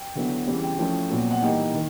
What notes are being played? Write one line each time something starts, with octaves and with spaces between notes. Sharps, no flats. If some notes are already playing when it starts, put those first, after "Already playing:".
Already playing: G5
D3 F#3 B3 E4
C#3 E3 G3 C4
G5
F3 A3 C#4 E4 G5
A#2 F#3 B3
F#5
E3 G3 A#3 D#4 G5
D#3